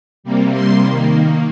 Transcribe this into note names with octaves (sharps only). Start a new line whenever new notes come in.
C3 G3 A#3
C6
D#3 A#3